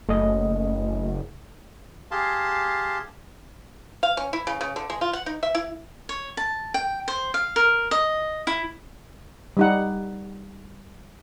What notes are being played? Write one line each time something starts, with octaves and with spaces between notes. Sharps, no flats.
F#1 A3 D#5
G4 G#4 F5 A5 C6
F5
C#4
E4
C#3
C#3
D3
G#3
F4
F#5
D#4
E5
E4
C#5
A5
G5
C5
F5
A#4
D#5
E4
G3 D#4 F#5